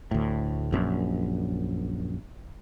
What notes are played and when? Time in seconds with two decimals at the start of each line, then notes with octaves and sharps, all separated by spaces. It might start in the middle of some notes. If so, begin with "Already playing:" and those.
0.11 D2 A2
0.72 A#1 F#2